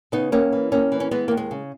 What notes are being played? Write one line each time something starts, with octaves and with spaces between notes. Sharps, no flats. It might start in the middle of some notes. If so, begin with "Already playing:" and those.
C#3 B3 D#4
D#2 A#3 C#4
E3
D#2 A#3 C#4
E3
C#4
E3 G#3 B3
D#2 A#3
G#3
C#3